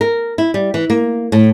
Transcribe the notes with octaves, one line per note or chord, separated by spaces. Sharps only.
A#4
E4
G3
E3
A#3
A2